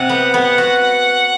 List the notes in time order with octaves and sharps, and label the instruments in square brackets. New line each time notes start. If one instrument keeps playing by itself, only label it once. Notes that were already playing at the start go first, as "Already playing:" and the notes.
Already playing: [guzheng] C3 [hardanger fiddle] F#5
[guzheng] B3
B3
F#4